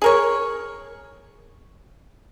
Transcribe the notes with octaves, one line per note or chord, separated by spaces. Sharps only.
G#4 A#4 C#5